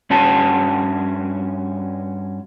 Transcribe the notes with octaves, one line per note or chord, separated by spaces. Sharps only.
G2 C#4 F#4 A5